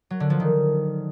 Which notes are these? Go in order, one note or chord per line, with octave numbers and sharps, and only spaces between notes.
F#3
D3
F3
D#3